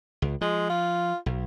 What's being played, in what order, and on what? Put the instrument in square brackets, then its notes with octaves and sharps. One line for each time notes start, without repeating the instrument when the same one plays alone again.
[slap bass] C#2
[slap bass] F3 [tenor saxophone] G#3
[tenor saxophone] F4
[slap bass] B1